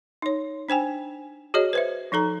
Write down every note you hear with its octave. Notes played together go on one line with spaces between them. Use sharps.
D#4 C#5
D4 C5 G5 G#5
F#4 G#4 C#5 D#5
B4 C5 E5
F3 D#4 A4 A#5